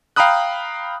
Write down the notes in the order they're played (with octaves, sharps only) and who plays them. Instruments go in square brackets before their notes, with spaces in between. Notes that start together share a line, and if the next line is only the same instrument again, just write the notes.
[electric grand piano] F5 G5 A#5 B5 D#6 F#6